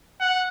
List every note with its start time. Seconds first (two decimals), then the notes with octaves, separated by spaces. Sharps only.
0.21 F#5